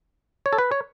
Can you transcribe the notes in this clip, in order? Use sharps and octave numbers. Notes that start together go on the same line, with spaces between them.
C#5
A4
B4
C#5